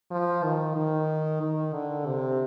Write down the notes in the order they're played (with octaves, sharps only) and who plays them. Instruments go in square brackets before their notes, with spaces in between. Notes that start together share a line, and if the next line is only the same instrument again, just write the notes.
[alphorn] F3
D#3
D#3
D#3
D3
C3